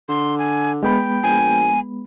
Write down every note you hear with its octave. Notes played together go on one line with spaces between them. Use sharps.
D3 C6
G#5
G#3 B3 G5 B5
A#1 G#5